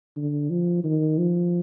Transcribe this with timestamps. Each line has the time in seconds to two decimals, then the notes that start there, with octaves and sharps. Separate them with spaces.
0.17 D3
0.50 F3
0.84 D#3
1.18 F3